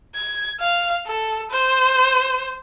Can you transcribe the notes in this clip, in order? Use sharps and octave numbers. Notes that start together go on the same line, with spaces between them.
G#6
F5
A4
C5